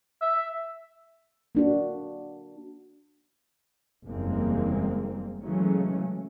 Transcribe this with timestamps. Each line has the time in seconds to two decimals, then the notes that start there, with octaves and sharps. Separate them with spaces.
0.22 E5
1.55 A#3 D4 F#4
4.06 F#1 E2 G3 G#3 A#3 C4
5.41 C#3 E3 F#3 G#3 A3 C#4